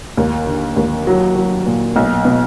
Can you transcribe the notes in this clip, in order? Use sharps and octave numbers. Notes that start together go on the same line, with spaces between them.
D#2
D3
D#2
F#3
F#3
A#2
B1
B2